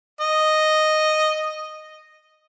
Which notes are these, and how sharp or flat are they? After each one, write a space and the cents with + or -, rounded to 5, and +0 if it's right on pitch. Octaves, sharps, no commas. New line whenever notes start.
D#5 -5